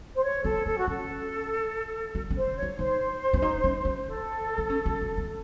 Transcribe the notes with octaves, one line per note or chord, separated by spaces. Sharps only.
C5
C#5
C4 A4
A#3 A4
F#4
C#4 A4
D#4
C#4
C5
C#5
D#4
D#4 C5
C#4
D#4
C#4
D#4
A4
D#4
C#4
D#4
C#4
C#4